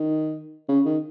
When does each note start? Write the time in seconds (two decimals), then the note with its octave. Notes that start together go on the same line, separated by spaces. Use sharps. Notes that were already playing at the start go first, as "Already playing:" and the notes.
Already playing: D#3
0.69 C#3
0.85 D#3